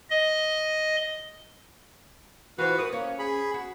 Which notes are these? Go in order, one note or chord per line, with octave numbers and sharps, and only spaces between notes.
D#5
E3 F4 F#4 B4 C5
F#4 A#4 B4 D#6
A#3 C#4
G#4 B5
F#4